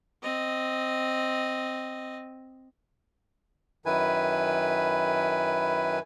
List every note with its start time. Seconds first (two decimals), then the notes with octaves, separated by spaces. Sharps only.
0.23 C4 D#5
3.86 F#2 D#3 E4 B4 G#5